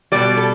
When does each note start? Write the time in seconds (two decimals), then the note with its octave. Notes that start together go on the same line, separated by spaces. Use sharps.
0.12 B2 G3 D5
0.37 A4